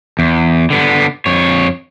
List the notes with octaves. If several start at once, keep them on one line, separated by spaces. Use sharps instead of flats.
E2
D3 B3
F2 C#5